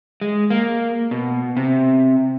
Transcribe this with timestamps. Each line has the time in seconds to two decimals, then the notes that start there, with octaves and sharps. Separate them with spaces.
0.21 G#3
0.50 A#3
1.11 B2
1.57 C3